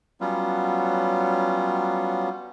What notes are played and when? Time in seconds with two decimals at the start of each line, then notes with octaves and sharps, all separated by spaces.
0.21 F#3 G3 B3 C#4 F4